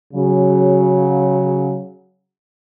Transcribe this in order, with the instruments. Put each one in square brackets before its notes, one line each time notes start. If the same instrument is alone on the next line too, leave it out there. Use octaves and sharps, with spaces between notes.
[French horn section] C#3 F#3